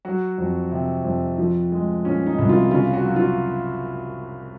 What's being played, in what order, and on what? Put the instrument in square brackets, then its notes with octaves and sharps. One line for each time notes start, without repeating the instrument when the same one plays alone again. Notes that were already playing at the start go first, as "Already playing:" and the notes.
[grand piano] F#3 F#4
F2
C3
F2
F3
G#3
A#2 C#4
D#4
C2
F4
C#3 F4
F#4
F#3
F4